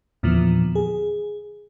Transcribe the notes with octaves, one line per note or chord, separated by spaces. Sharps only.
E2 A#2 D3 E3 F3 B3
G#4